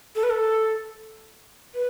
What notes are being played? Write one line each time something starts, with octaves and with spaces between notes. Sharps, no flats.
A4
B4
A4
B4